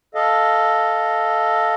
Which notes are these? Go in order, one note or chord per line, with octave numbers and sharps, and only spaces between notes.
A4 D#5 F5